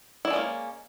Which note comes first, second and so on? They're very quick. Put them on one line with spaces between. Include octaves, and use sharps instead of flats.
E4 D5 G#3 C#4 A#3